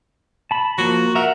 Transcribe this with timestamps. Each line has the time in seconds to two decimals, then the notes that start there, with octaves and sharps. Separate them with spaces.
0.51 A5 B5
0.78 F3 A#3 F#4
1.15 A#4 E5 F#5